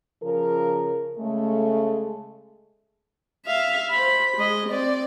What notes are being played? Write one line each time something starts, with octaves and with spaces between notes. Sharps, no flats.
C#3 F3 A#4
C#3 G#3 A3
E5 F5
C5 B5
G#3 D#5
C4 D5